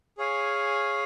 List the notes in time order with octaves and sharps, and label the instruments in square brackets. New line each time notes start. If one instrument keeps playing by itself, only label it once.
[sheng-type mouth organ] G#4 C#5 F5 G#5